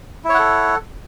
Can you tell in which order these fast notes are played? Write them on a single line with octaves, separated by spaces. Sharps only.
E4 C#5 F#5 A4